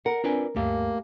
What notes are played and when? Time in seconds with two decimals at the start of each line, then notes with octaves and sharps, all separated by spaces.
0.06 A#4 F#5
0.24 C4 D4 F4 B4 D5 G#5
0.56 D2 G2 A3 A#3 G4